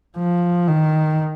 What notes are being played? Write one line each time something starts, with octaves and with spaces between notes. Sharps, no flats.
F3
D#3